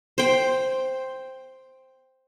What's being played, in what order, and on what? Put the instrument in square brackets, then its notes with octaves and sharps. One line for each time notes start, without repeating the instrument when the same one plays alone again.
[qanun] C5 G5